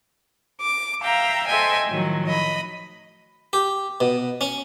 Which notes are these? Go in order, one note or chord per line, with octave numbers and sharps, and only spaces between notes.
D6
E5 F5 G5 A#5
A4 C5 D#5 E5 G5 G#5
A2 D#3 F3 F#3
D#5 B5
G4
B2
C#4